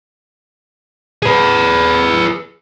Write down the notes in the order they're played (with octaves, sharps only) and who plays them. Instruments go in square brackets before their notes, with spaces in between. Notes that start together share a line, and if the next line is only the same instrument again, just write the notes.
[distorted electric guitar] G#4 B4